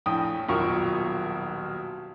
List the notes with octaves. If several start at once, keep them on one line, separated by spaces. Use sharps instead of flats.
A#1 A2 G5 D#6
D#1 B1 B2 F4 A#4 C#6